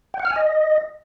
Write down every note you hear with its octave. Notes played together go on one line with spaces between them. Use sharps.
G5
F#5
F6
G#5
D#5